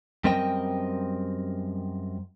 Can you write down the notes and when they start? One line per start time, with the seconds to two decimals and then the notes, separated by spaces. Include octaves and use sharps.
0.24 F#2 G3 C4 A#4 D#5 G5